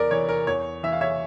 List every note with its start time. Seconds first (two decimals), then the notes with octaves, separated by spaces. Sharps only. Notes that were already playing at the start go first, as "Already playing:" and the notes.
Already playing: E2 A#4 D5
0.11 E3 C#5
0.29 A#4
0.47 E2 C#5
0.83 E3 E5
0.92 F5
1.01 C#5 E5